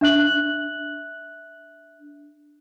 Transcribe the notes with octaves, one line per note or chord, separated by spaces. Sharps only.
D4 E5 F#6 F#7